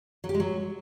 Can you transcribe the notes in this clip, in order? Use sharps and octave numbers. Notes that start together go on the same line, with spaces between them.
F#3
G4
G#3
F#3